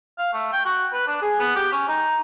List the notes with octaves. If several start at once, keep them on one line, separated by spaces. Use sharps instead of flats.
F5
A3
G5
F#4
B4
D4
G#4
B3
G4
C#4
D#4